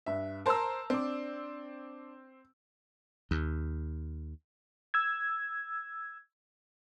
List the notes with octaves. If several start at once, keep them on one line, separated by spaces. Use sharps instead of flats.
G2 E5
A#4 C5 A5 A#5 E6
C4 D4 D6
D#2
E6 G#6